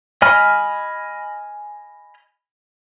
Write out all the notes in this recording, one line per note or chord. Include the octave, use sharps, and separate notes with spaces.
D#5 G#5 B5 F6